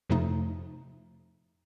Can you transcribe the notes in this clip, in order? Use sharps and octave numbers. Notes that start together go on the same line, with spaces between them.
F2 C3 F3 A3 D#4